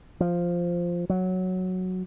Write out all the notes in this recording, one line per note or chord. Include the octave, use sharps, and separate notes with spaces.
F3
F#3